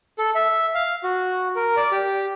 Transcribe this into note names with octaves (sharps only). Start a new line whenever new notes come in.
A4
E5
F5
F#4
A#4
D5
G4